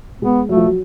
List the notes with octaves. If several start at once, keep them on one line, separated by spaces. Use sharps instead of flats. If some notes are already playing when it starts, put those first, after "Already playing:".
G#3 B3
F#3 A3
F3
F#3